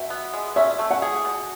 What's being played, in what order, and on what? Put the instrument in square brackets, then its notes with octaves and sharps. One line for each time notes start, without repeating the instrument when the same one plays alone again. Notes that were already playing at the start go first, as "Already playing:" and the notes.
Already playing: [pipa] B2 [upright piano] E5
[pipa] B3
G#3
[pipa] C#4 [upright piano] E5
[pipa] A3
[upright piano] F#5
[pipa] G#4
B2